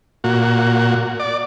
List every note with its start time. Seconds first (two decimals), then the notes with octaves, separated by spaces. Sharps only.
0.24 A#2 F#4
1.20 D5